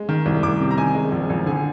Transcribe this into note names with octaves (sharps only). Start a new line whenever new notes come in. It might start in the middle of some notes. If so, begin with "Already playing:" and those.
Already playing: G#3
D#3
C2
C2 D6
C3
A#5
D#3 G#5
G#3
A#1
A#1
D3 G#5